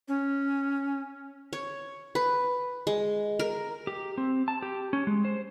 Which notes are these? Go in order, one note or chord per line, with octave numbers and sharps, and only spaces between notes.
C#4
C#5
B4
G#3
A#4
G4
C4
A5
G4
C#4
G#3
C5